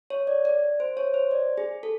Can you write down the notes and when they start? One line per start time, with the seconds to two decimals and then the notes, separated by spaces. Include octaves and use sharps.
0.10 C#5
0.27 D5
0.45 D5
0.80 C5
0.97 C#5
1.14 C5
1.31 D5
1.58 G#4
1.83 A4